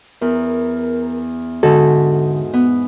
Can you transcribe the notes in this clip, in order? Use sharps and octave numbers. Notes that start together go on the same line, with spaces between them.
E2 A#4
G#2 D3 F#4 A4
B3